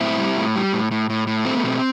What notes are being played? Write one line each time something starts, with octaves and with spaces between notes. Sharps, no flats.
A2 C4 E4
G3
A2
G3
A2
A2
A2
A2
A3 C4
B3
B2 C4